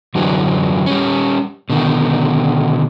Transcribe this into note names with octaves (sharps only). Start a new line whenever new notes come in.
F#2 D3 E3 F#3 G3
G3 C#4
B2 D3 D#3